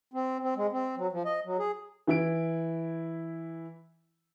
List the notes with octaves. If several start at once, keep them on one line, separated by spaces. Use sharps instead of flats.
C4
C4
G#3
C4
F#3
F3
D#5
F#3
G#4
E3 E4 D7